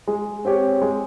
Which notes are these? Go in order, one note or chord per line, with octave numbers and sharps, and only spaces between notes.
G#3
C4 G4 C#5
G#3